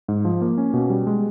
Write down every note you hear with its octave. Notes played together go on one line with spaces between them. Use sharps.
G#2
F3
A#3
C#4
B2
G3
G#3